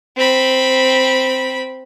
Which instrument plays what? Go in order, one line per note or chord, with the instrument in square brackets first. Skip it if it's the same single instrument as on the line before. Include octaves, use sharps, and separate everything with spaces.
[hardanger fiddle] C4 B5